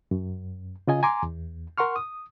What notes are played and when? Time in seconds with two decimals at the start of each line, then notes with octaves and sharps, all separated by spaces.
0.11 F#2
0.87 C#3 F4 D#5 G#5
1.03 G#5 A#5 C6 D6
1.23 E2
1.78 A#4 F#5 C6 C#6 F6
1.96 D#6